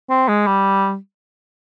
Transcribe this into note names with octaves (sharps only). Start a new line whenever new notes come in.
C4
G#3
G3